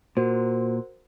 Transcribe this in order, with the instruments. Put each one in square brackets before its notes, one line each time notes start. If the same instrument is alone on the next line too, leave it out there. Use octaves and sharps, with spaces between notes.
[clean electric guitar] A#2 [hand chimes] F#4 A#4 C5